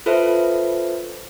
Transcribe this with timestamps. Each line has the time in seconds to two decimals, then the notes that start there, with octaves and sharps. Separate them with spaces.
0.06 F4 A4 B4 C5 E5